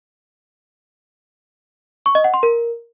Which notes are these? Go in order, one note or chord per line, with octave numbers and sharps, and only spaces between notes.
C#6
D#5
F#5
C6
A#4